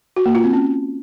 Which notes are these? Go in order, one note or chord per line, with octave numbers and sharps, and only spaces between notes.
F#4
A#3
F4
C4
C#4